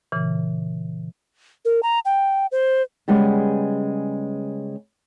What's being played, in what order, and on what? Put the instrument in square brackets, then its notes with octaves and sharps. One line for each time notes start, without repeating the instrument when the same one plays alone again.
[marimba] A#2 C#3 E3
[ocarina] A#4
A#5
G5
C5
[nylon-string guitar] C#3 G3 G#3 B3